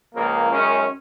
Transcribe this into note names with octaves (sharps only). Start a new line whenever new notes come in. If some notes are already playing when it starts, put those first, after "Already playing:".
C#2 C#3 F3 A#3
F#2 D#3 G#3 C#4